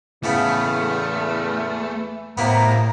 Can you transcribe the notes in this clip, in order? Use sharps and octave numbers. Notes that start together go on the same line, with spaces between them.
E2 A2 C#3 E3 A3 B3
A2 C3 A#3 B3 A#5